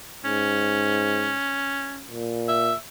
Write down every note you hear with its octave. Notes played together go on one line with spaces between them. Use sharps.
G#2 C#4
A#2
E5